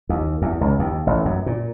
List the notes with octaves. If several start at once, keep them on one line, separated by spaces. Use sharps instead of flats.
D#2
E2
C#2
D#2
A1
F#2
A#2